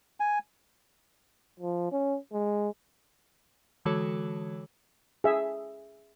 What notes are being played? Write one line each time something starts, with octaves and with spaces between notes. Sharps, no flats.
G#5
F3
C#4
G#3
D3 E3 G#3 F#4 A4 C#5
G#4 E5